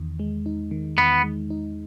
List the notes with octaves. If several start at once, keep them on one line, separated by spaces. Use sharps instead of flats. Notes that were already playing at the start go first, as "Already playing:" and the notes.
Already playing: E2 D#3
G#3
D#4
D#3
E2 B3
G#3
D#4